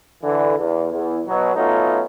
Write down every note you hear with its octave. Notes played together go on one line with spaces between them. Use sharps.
D3 E3
E2
E2
B2 F#3
F#3 A3 B3 C#4 D#4 F4